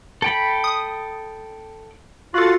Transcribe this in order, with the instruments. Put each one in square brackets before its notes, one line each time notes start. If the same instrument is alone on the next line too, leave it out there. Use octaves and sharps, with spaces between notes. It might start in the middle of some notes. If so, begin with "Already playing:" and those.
[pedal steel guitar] A4 G5 B5
[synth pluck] D#6
[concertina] F4 [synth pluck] F#4 A4